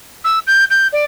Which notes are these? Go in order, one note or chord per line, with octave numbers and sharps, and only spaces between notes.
E6
G6
G6
D5